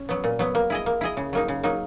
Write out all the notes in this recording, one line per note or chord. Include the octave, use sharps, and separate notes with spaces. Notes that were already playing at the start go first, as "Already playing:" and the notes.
Already playing: C#4
F#3 B3
A#2
F#3 B3
A#3
E4 G#4 D#5
A#3
E4 G#4 D#5
C#3
F#3 A#3 D#4
C#3
F#3 A#3 D#4